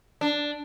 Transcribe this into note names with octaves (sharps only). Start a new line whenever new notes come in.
D4